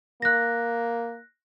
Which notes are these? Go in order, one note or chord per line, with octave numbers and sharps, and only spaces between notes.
A#3 F#6 A#6